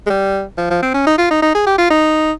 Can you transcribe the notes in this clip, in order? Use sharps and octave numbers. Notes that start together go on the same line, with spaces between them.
G#3
G3
F3
F3
C4
C#4
D#4
F4
D#4
D#4
G#4
G4
F4
D#4